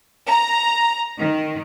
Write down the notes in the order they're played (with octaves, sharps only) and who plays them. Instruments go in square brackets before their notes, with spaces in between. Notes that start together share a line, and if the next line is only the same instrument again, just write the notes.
[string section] A#5
D#3